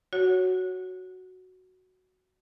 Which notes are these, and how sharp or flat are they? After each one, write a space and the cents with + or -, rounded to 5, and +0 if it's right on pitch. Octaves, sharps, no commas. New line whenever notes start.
F#4 +0 C#5 +0 F#5 +0